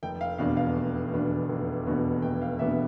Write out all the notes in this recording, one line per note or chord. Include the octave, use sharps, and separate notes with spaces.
F1 G5
F5
E2 B2 B3 D4 F5
F5
F1
E2 B2 B3 D4
F1
E2 B2 B3 D4
F1 G5
F5
E2 B2 B3 D4 E5